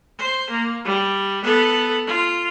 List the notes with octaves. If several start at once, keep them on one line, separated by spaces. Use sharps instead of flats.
C5
A#3
G3
B3 A4
F4